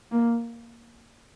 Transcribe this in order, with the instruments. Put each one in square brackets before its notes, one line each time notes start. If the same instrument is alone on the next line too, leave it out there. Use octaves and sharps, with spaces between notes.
[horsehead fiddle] A#3